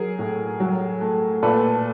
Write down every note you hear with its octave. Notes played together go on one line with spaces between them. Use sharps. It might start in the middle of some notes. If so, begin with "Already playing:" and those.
Already playing: F#3 G#4 A#4
A2
F#3
A3
A#2 A4 B4